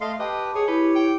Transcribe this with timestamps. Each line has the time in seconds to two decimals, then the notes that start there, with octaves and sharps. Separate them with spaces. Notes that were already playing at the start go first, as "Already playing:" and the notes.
0.01 A3 D#5 F5 C6
0.19 G4 B4 D#5 A5
0.55 G#4 C#5
0.68 E4 G4 B4 D6
0.95 G5